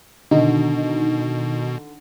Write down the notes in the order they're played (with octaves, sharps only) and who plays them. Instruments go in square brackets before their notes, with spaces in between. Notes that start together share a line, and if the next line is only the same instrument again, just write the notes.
[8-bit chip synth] B2 [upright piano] D3 [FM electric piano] D#3 D#4